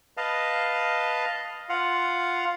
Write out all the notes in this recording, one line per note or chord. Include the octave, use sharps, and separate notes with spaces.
B4 D#5 F5 A5
F4 F5 F#5